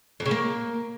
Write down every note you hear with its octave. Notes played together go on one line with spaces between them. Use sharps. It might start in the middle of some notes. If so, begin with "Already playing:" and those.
F2
C#3
A#3